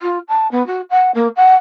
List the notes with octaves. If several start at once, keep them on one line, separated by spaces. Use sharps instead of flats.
F4
A5
B3
F#4
F#5
A#3
F#5